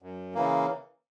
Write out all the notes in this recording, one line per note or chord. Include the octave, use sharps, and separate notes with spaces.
F#2
C#3 E3 A#3